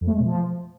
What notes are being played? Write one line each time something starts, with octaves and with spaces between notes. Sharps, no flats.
F2
A3
G#3
B2
F3